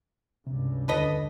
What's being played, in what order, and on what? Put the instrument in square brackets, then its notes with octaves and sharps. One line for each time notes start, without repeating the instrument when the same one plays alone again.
[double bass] C#2 G2 [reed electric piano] C3
[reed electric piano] D#2 D3 [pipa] A4 B4 D#5